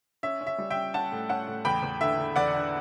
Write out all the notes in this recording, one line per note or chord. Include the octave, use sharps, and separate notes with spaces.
C#4 E5
C#4
E5
G3
E5 G5
C#4
C#4 F#5 A5
A2
C#4 F#5 A5
A2
E2 G5 B5
E2
D3 E5
D3
E2 D5 F#5
D3